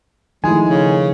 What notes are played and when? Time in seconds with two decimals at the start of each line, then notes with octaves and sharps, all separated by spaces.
0.44 D#3 F3 G#3 A3 D#4 E4 G#5
0.69 C#3